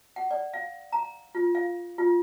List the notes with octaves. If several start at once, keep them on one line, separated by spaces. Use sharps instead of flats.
F#5
D5
F5
A#5
F4
F5
F4